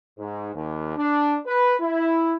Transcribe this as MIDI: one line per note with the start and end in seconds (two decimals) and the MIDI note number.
0.19 0.53 44
0.54 0.96 39
0.97 1.35 62
1.46 1.74 71
1.80 2.35 64